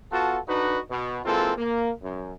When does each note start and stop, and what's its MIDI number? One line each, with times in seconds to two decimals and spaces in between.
0.12 0.40 59
0.12 0.40 65
0.12 0.40 66
0.12 0.40 69
0.12 0.40 78
0.12 0.40 81
0.49 0.80 50
0.49 0.80 62
0.49 0.80 63
0.49 0.80 66
0.49 0.80 71
0.49 0.80 75
0.90 1.20 47
1.25 1.53 52
1.25 1.53 56
1.25 1.53 58
1.25 1.53 60
1.25 1.53 65
1.25 1.53 69
1.58 1.90 58
2.03 2.33 42